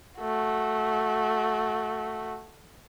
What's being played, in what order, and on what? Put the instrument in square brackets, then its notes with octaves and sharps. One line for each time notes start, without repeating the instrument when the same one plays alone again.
[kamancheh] A3 F#4